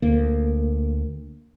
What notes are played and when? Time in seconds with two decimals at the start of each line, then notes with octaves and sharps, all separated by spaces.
0.02 D2 A#3